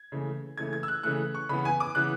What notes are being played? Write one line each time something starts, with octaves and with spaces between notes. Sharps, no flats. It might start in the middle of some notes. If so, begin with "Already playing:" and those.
Already playing: G#6
C#3 E3 A3
C#3 E3 A3 G#6
G#6
E6
F#6
C#3 E3 A3 F#6
C#6
C#3 E3 B3 B5
G#5
D6
C#3 E3 B3 F#6